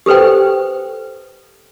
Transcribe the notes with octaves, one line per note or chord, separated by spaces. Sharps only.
G4 A4 B4 C5 G5